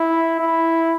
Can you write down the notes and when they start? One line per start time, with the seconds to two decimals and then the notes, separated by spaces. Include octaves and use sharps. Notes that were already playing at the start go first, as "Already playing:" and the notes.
Already playing: E4
0.39 E4